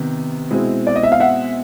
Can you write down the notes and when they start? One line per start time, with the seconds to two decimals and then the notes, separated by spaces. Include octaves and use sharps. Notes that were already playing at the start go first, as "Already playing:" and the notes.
Already playing: C3 D#3 B3
0.50 B2 G#3 C4 E4
0.87 D5
0.96 D#5
1.03 E5
1.12 F5
1.20 E5 F#5